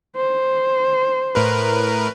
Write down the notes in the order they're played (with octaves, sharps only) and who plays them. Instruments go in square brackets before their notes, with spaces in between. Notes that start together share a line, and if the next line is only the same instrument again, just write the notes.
[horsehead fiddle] C5
[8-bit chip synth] A2 A#4 B4